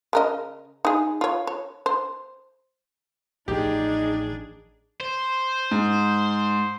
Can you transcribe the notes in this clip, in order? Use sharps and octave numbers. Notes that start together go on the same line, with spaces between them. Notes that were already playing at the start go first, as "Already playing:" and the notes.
C#3 A#4 D#5
D#4 G#4
F4 C#5
C#5
C5
A1 F3 D4 D#4 G4 G#4
C5
G#2